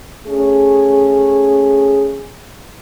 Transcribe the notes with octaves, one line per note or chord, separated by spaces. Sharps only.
A3 C#4 G#4